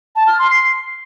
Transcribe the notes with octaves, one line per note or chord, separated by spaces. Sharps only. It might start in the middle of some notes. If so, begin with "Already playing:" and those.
A5
F6
C6
C7